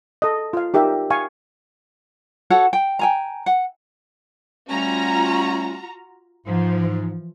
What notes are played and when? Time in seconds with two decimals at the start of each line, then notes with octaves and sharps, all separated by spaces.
0.22 A4 D#5
0.53 F4 F5
0.74 D#4 G4 A#4 E5
1.10 F5 G#5 C#6
2.50 F#4 A4 C#5 F#5
2.73 G5
2.99 G5 G#5 A#5
3.46 F#5
4.70 G3 A3 C#4 F4 F#4 A#5
6.47 G#2 E3 F3